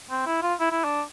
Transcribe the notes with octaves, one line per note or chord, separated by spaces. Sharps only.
C4
E4
F4
E4
E4
D4